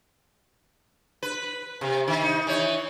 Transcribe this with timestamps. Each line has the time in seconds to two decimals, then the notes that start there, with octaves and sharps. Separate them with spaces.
1.23 B4
1.81 C3
2.08 D#3
2.23 D#4
2.47 E3 C#5